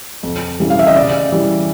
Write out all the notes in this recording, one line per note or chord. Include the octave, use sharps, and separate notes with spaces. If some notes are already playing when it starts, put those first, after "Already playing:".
F2
C#3 E3 G3
F5
E5
D#5
C#3 D5
E3 G3